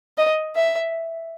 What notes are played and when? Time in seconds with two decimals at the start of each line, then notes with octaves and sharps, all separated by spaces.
0.18 D#5
0.56 E5